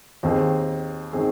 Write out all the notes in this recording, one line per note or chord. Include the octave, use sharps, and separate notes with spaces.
D#2 D#3 C4 G#4
D#3 C4 G#4